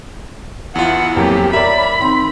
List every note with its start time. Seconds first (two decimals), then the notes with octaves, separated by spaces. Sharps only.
0.75 E2 E4 F4 F#5
1.16 F2 F#3 A#3 G4
1.53 A#4 C#5 D5 E5 B5
2.00 D#3 C4 C6